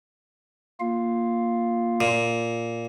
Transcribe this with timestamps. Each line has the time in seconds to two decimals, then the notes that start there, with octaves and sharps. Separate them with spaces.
0.80 A#3 F4 F5
2.01 A#2